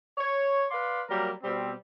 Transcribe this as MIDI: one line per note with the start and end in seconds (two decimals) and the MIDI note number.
0.18 0.64 73
0.71 1.01 71
0.71 1.01 74
0.71 1.01 77
0.71 1.01 84
1.08 1.31 54
1.08 1.31 55
1.08 1.31 58
1.08 1.31 70
1.43 1.71 47
1.43 1.71 55
1.43 1.71 60